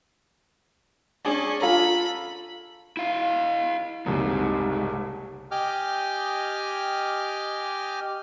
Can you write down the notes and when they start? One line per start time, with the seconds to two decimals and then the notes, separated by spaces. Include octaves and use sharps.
1.25 C#4 D4 G#4 D5
1.61 F4 A4 A#5 B5
2.97 E4 F5
4.06 F#1 C2 G#2
5.51 G4 D#5 G5 G#5 D6 F6